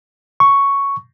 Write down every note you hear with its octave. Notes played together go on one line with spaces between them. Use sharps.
C#6